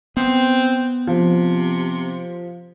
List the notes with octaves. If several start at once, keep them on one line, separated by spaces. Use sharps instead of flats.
B3 C4
C3 F3